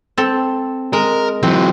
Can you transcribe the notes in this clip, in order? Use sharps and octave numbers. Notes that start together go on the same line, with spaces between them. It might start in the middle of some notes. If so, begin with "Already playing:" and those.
C4 A4
G#3 A#4
E3 F#3 C4